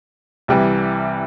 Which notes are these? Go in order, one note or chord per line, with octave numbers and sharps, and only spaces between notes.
C2 C3 E3 G3